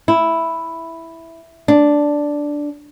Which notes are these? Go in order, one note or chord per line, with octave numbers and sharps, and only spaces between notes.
E4
D4